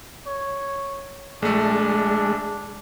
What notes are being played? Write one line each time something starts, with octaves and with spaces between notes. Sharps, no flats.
C#5
A#1 G#3 A3 D4